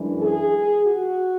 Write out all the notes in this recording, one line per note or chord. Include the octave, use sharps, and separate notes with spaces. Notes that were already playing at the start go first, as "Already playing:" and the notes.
Already playing: F#2 E3 G#3 D4
G#4
F#4